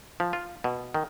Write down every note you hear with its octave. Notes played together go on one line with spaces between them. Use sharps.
F3
F4
B2
D#3